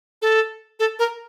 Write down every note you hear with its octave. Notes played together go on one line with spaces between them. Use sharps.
A4
A4
A#4